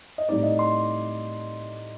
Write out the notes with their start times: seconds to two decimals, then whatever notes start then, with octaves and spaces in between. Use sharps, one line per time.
0.18 D#5
0.29 A2 G3 C4 D#4 D5
0.43 D#5
0.59 C6